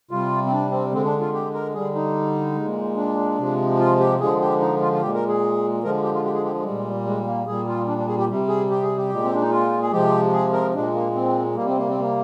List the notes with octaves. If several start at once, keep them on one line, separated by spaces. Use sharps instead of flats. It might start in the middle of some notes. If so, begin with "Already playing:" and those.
C3 G3 F4
C4
D4
C4
D3 G#3 C4
D4
F4
G4
A#4
D3 G3 G#4
D#4
A#2 G#3
D4
C3 F3 G#3
F4
G4
D3 F3 G#3 G#4
G4
D#4
F4
F4
A#2 G#3 G4
A#4
G#4
D3 F3 G#3 A#4
G4
F4
G4
G#4
G4
G#3
G3
A#2
G#3
A#3
A#2 G3 G#4
F4
D4
D4
G#4
G4
C3 G3
G#4
G4
G#4
G4
A#2 G#3
C4
D4
D#4
F4
G#4
C3 F3 G#3 G4
G#4
A#4
A#2 G#3 D4
A#3
C4
C3 G3 A#3
C4
A#3
C4
A#3